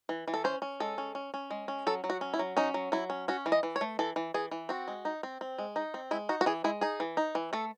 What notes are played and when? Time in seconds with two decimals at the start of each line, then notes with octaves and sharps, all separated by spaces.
0.09 E3
0.28 E3
0.34 A4
0.44 C#4 C5
0.62 C#4
0.80 G#3 A4
0.98 C#4
1.15 C#4
1.34 C#4
1.51 G#3
1.68 C#4
1.87 F#3 A4
2.04 F#3
2.10 F#4
2.21 C#4
2.34 E4
2.39 F#3
2.57 C#4 D#4
2.74 F#3
2.92 F#3 E4
3.10 C#4
3.28 C#4 F#4
3.46 E3
3.52 D#5
3.63 E3
3.76 C#5
3.81 A3
3.99 E3 A4
4.16 E3
4.34 E3 G#4
4.51 E3
4.69 C4 F#4
4.88 G#3
5.05 D#4
5.23 C4
5.41 C4
5.58 G#3
5.76 D#4
5.94 C4
6.11 G#3 E4
6.29 D#4 F#4
6.41 F#4
6.46 E3 G#4
6.64 G#3 E4
6.81 D#4 G#4
7.00 E3
7.17 D#4
7.35 E3
7.53 A3 A4